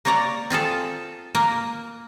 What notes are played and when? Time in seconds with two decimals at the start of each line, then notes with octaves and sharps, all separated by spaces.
0.05 A#3 A#4 C#5 D5 A#5
0.50 C4 F4 G#4 A4
1.35 A#3 A#4